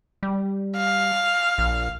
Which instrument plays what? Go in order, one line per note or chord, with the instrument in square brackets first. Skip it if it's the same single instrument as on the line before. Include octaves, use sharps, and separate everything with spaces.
[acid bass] G3
[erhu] F5
[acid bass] A#1